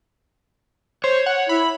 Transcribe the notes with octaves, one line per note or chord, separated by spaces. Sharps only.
C5 C#5
F#5
E4 B5